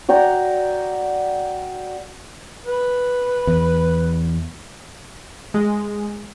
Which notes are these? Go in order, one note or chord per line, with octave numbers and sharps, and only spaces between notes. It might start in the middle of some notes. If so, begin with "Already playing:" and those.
F#4 D5 G5 A#5
B4
E2
G#3